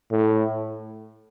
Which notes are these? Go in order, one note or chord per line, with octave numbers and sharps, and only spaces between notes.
A2